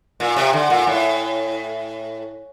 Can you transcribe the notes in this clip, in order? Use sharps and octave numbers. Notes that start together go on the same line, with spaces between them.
A#2
C3
D3
A#2
A2